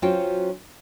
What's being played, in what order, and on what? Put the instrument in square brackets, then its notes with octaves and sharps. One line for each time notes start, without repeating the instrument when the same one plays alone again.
[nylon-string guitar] F#3 C#4 F4 F#4 C5 G5